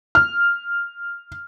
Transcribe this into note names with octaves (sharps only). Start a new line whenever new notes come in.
F6